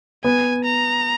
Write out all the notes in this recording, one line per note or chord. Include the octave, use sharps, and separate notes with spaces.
B3 G#5
A#5